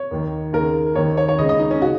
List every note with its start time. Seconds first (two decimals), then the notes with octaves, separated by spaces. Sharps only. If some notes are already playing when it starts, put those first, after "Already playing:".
Already playing: C#5
0.11 D#2 D#3
0.53 D#2 C#3 A#4
0.95 D#2 D#3 C#5
1.17 C#5
1.29 C#5
1.38 C#2 C#3 D#5
1.49 D#5
1.59 D#4
1.71 C#4
1.82 C#3 F#4